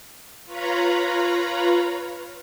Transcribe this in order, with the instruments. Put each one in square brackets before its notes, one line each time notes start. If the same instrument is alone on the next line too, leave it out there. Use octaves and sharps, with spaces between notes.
[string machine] F4 B4 C#5 F5 A#5 B5